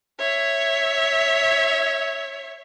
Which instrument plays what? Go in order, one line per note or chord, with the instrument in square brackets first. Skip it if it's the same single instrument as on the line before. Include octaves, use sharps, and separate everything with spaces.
[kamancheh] C#5 E5